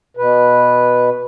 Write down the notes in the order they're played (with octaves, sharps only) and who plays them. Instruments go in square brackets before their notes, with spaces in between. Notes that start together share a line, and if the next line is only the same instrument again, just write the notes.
[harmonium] B2 B4